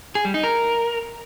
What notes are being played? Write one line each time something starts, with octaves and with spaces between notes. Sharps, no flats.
G#4
G3
D#4
A#4